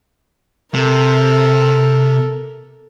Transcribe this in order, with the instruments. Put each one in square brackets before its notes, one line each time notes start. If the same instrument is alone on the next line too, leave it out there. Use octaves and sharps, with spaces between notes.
[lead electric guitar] C3 [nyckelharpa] A4 A#4